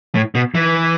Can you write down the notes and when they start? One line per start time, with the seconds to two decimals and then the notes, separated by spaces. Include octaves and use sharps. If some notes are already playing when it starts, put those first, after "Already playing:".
0.15 A2
0.35 B2
0.55 E3